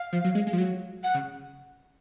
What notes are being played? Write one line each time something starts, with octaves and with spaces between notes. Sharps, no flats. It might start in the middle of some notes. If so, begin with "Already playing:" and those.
Already playing: F5
F3
F#3
G#3
G#3
F3
F#3
F#5
C#3